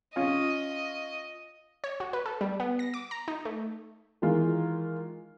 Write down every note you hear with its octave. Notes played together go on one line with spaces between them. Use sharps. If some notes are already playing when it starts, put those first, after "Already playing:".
C#4 F4 D#5
C#5
F#4
B4
A4
G3
B3
A#6
D6
A#5
D#4
A3
D#3 E3 G#3 F4